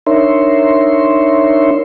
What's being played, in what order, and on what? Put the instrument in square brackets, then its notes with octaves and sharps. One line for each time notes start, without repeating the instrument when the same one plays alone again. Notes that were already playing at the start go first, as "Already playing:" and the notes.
[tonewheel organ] D4 D#4 A#4 C#5 E5 C6